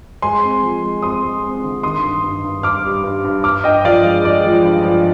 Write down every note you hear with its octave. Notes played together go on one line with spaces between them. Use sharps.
G#3 G#5 C6
C4
F3
G#3
C4 C6 D#6
G#3
C4
D3
D#3 C6 D#6
G2
G2
G2
G2 D6 F6
G3
G2
G2
G2 D6 F6
G2 D#5 G5
F3 D5 F5
G#3
G#3 D5
F3
G2
F3